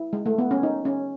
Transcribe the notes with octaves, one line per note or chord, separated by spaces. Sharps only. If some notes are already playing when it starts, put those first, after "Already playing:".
Already playing: E4
G#3
A3
B3
C#4
D#4
C#4